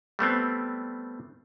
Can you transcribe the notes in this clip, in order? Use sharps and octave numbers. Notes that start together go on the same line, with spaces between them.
G3 A3 B3 C4